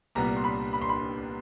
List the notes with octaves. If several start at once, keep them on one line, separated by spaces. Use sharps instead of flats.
C2 A#2 G3 B3 A#5
C6
B5
B5
C6
B5